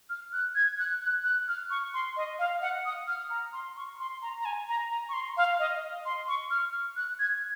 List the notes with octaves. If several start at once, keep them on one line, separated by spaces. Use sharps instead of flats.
F6
F#6
G#6
F#6
F#6
F#6
F6
C#6
C6
D#5
F5
F#5
D#6
F6
A#5
C6
C#6
C6
A#5
A#5
G#5
A#5
A#5
C#6
C6
F5
D#5
C6
C#6
F6
F#6
G#6